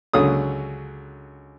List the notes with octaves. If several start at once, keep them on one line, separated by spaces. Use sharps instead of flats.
C#2 D3 F#3 D#6